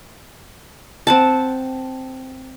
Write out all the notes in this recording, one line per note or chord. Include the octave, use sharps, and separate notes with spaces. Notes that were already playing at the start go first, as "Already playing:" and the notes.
C4 F#5 A5